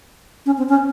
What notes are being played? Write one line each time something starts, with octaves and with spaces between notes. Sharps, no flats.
C#4
C4
C#4